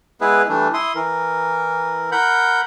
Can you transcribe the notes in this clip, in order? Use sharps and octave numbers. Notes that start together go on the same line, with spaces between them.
G#3 B3 E4 G#4 B4
E3 G3 A3 D4
E4 C6 D#6
E3 A#4
A#4 F#5 B5 G6